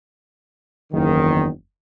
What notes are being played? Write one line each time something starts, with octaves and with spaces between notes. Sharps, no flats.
F#1 E2 D#3